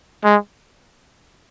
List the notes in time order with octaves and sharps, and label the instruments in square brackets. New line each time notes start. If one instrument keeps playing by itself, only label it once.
[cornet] G#3